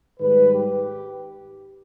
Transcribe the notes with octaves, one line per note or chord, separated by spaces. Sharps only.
G#2 D#3 G3 B4
G4